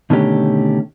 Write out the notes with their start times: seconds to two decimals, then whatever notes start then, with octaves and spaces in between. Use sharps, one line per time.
0.10 B2 D3 D#3 A3 C#4 G4